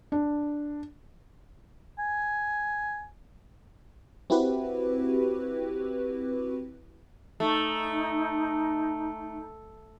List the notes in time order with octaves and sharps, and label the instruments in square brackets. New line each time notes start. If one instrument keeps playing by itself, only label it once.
[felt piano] D4
[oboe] G#5
[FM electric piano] C4 E4 F#4 G4 B4
[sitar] A3 [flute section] D#4